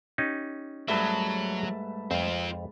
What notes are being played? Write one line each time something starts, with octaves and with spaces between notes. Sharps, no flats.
C#4 D#4 G4
G#2 F#3 G3 A3 B4 E5 A5
F2 C4 F4